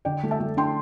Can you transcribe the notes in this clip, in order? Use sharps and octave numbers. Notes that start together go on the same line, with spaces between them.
D3 D5 G5
A3
E5 A5
A3
D4 G5 C6